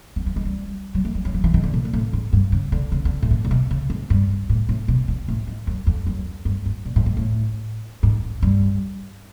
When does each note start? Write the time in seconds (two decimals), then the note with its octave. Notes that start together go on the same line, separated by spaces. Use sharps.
0.16 B3
0.26 A3
0.36 G#3
0.45 G3
0.95 F#3
1.05 A3
1.15 G3
1.25 F#3
1.34 F3
1.44 E3
1.54 D#3
1.63 D3
1.74 A#2
1.85 A#2
1.93 A2
2.13 G#2
2.33 G2
2.52 C#3
2.72 D3
2.92 C#3
3.05 D3
3.22 A2
3.31 A#2
3.45 A#2
3.51 B2
3.71 C#3
3.90 G#2
4.10 G2
4.49 A2
4.69 A2
4.88 B2
5.08 A#2
5.28 A2
5.47 G#2
5.67 F#2
5.87 F2
6.07 F#2
6.45 G2
6.66 G#2
6.85 A#2
6.96 A2
7.06 G#2
7.17 A2
8.03 G#2
8.42 G2